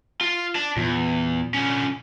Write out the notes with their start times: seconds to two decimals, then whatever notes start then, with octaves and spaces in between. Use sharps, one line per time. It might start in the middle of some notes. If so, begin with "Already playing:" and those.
0.21 F4
0.55 D5 A5
0.77 E2 A#2
1.54 D3 C#4